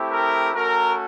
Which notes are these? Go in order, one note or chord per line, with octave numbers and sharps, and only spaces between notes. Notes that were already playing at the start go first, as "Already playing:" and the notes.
Already playing: A3 C4 E4 G4
A#4
A3 C#4 F#4 A#4